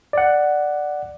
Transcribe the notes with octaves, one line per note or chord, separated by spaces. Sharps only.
D5 F#5